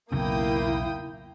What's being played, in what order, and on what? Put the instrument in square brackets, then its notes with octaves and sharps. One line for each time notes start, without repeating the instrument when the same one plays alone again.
[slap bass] B1 E2 A2 [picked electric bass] C#3 [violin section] A#3 G5 D#6 [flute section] E4